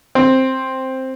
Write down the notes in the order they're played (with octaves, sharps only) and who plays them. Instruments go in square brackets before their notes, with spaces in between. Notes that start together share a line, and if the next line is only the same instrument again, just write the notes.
[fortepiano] C4